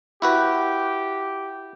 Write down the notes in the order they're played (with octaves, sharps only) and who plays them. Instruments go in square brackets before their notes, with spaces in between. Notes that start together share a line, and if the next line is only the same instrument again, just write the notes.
[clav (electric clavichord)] E4 F#4 B4 [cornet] G4